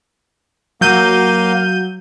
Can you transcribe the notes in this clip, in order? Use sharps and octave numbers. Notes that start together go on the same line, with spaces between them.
F#3 A#3 F5 G6 D#7